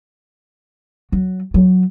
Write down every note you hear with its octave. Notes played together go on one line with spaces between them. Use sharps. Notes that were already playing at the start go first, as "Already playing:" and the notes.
F#3
F#3